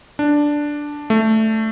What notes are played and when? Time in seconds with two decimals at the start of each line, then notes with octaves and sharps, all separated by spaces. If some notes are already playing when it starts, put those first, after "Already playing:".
0.19 D4
1.10 A3